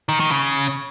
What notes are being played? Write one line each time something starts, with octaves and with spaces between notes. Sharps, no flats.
D#3
D#3
C#3